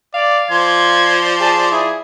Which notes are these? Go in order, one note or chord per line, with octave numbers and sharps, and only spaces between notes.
D5 F5
F3 D5 C6 G#6
G#4 A5
E4 G#4